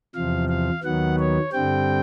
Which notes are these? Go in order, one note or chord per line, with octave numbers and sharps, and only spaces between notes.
E2 C3 F3 F5
F5
D#2 D#3 F#3 B3 F#5
C#5
G2 D3 G3 C4 G5